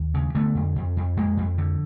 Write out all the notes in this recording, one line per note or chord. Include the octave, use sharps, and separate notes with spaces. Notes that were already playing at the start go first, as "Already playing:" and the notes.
Already playing: D#2
C#3
D3 A3 B3
F2
F2
F2
F2 G#3 A#3
F2
D3